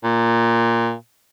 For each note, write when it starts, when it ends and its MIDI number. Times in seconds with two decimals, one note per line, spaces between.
0.04 0.93 46